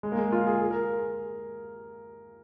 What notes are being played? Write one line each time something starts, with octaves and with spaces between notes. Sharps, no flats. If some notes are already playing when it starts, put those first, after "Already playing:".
G#3
A#3
G#3
F4
G#4
G#4
A#4